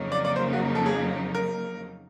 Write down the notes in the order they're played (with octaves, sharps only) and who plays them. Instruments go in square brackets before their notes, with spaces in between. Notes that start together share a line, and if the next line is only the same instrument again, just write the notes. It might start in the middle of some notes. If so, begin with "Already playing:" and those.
Already playing: [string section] F2 C#3 F#3 A#3 D#4
[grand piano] D5
D5
C5
F#4
A4
G#4
A#4